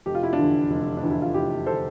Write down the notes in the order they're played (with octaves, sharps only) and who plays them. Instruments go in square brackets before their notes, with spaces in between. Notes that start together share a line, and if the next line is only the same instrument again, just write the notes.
[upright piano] F1 G4
F4
E4
D4 F4
E2 D3
F1
D4
E2 D3
E4
F4
F1 E4 G4
A4 C5
D3